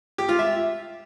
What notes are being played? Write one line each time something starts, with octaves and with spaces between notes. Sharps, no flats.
G4
F4
E5